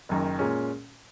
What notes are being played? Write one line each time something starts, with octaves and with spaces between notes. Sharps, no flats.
F#1 F#2 D#3
A#2 G#3 C#4